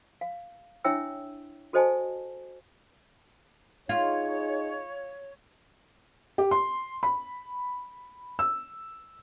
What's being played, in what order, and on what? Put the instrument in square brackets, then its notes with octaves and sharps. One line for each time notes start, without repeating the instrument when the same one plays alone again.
[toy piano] F5
D4 E4 C#5 E5 G5 E6
F#4 A4 C5 D#5 G#5 A5
[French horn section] D#4 G#4 [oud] F4 [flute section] C#5 [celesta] F5 G#6
[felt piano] G4
C6
B5
E6